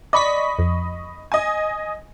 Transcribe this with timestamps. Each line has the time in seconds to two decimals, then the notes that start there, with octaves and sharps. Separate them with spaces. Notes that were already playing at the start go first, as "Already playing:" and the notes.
0.13 D5 D#5 B5 C#6 B6
0.58 F2
1.32 D#5 G#5